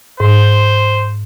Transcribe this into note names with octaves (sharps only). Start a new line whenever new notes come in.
G#2 C5